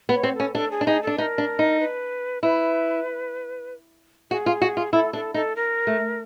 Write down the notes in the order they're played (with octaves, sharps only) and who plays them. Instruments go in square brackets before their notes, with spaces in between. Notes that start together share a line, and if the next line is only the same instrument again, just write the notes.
[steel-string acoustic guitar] B3
[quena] C#5
[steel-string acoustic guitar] C4
[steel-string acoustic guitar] C#4 [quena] A4
[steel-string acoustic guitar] D4 [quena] A4
[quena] G#4
[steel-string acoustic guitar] D4
[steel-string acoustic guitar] D#4 [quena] G#4
[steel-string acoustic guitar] D4 [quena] A4
[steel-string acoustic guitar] D#4 [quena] B4
[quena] A#4
[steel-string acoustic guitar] D4
D#4
[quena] B4
[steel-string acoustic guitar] E4 [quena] B4
[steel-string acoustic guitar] F#4 [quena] G#4
[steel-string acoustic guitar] F4
F#4
F4
[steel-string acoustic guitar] E4 [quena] A4
[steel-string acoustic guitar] D4 [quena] A4
[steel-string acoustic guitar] D#4 [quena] A4
[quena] A#4
[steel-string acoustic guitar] A3